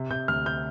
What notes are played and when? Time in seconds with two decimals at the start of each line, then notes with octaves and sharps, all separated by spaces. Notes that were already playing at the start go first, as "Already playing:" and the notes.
Already playing: C3
0.10 C3 G6
0.28 D2 F6
0.46 G6